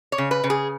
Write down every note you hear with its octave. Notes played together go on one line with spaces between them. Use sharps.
C#5
C#3
B4
C#3
G#4